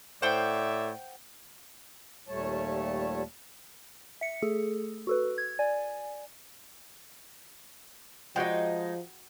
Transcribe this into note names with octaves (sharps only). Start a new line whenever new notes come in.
A2 C5 D5 E5 F#5 G5
D#2 A#2 G3 A3 C#5 A5
E5 C#7
A3 G#4 A4
F#4 A4 B4
G#6
D5 G#5
F3 G#3 D#4 F#4 F#5 G5